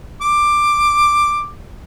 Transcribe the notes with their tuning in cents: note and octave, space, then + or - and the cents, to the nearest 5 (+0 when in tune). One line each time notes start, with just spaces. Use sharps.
D6 +10